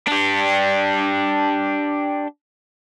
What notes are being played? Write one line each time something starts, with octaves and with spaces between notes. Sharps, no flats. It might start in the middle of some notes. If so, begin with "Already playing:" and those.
D4 G4